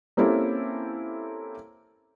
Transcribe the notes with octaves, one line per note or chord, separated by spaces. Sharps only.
A#3 C4 C#4 E4 G4 A4